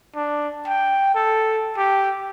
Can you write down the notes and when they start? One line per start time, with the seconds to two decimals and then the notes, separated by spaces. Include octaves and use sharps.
0.15 D4
0.67 G5
1.15 A4
1.77 G4